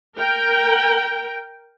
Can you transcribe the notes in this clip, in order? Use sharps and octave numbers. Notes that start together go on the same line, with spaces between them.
A#4 G5